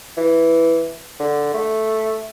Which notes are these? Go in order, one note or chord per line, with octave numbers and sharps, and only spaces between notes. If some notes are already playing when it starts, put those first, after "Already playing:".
E3
D3
A3